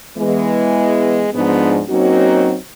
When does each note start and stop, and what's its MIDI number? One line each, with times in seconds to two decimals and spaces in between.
0.17 1.28 52
0.17 1.28 56
0.17 1.28 59
1.34 1.81 44
1.34 1.81 53
1.34 1.81 56
1.34 1.81 59
1.34 1.81 62
1.89 2.55 54
1.89 2.55 58
1.89 2.55 60
1.89 2.55 61
1.89 2.55 63
1.89 2.55 66